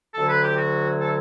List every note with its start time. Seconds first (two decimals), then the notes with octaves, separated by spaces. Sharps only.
0.14 D2 D3 F#3 A4
0.28 B4
0.44 G4
0.57 F#4
1.01 A4